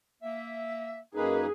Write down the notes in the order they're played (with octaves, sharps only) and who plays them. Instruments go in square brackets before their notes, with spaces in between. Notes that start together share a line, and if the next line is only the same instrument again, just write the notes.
[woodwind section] A#3 E5
[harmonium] F#2 A#3 D#4 [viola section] G#4 [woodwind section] B4